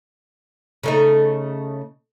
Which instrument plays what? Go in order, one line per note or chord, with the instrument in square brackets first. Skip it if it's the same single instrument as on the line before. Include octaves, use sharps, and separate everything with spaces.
[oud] C#3 A3 D#4